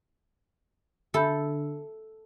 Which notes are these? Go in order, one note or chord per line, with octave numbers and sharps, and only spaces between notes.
D3 A4 E5 B5 G6